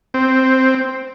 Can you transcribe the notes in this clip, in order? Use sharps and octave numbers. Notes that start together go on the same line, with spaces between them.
C4